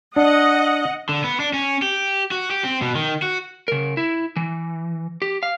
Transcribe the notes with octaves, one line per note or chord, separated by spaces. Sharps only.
D4 D#5 F#5
D3
B3
D4
C#4
G4
F#4
G4
C4
B2
D#3
F#4
C#3 A#4
E4
E3
G4
F5